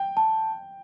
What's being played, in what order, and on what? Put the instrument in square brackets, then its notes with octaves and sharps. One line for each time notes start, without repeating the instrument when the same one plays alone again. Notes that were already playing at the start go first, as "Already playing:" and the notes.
Already playing: [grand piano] G5
[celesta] A5